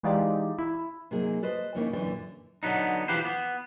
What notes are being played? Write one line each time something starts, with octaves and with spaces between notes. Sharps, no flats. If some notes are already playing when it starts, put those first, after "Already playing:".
E3 G#3 D#4 F4 G4 D5
E4
C3 F#3 A#3 D#4 G#4
A4 B4 C5 D#5
F2 C#3 A#3 D#4 E4 C#5
F#2 A#2 D3 E3
D3 F#3 B3 D#4
E3 F3 G4 B4 C5
B3